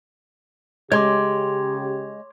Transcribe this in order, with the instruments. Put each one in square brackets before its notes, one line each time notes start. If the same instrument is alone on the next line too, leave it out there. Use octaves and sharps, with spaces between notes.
[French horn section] C#3 G4 [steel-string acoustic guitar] G#3 [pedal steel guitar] C#5 C6 D6